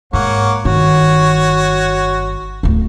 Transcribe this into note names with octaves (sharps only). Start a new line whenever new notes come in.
G#2 A#3 C#5 F#5
G1 D#3 F#4 C#5
D1 D2